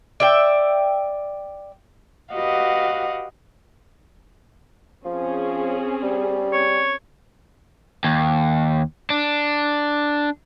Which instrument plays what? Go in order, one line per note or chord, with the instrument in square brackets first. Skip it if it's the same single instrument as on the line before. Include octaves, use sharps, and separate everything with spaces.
[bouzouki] D5 E5 G5
[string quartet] F#4 G4 B4 D#5 F5 F#5
[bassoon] F3 [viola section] C4 C#4 G#4
[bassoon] G3
[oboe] C#5
[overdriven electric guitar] D#2
D4